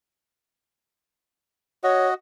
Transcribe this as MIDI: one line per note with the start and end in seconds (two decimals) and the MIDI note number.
1.84 2.14 66
1.84 2.08 73
1.84 2.14 75